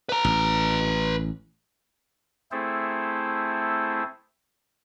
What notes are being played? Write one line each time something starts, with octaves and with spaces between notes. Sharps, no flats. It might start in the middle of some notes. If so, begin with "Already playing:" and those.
B4 A#5
A1
A3 C4 E4 G#4 A4 C5